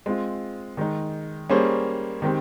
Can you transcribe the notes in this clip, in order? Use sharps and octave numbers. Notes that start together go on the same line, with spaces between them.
G#3 C4 F4
D#3 G#3 D#4
G3 A#3 C#4 G#4 C5
D#3 G#3 C4 G4